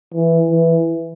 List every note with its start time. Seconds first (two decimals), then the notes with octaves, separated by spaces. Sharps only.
0.14 E3
0.51 E3